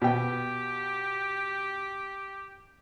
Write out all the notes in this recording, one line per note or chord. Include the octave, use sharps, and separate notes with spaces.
B2 G4 G5